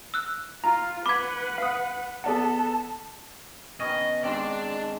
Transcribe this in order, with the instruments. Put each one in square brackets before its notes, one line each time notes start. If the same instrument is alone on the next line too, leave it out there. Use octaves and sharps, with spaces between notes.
[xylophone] E6 F#6
[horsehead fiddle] F4 [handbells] A#5
[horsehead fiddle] B4 F#5 [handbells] B5 B6 [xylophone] D6 G#6
[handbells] F5 D#6
[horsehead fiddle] B3 A4 [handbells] G#4 D5 F#5 [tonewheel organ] A5
[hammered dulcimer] D#3 B3 C#4 [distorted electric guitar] D#5
[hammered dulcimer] G#2 G#3 C4 [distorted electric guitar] D4 D5